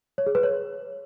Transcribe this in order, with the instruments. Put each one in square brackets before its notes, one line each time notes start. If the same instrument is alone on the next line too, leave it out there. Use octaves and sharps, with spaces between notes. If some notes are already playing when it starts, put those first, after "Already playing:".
[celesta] C#5
G#4
B4
C#5